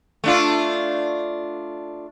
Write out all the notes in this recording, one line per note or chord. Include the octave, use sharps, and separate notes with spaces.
A3 D4 F4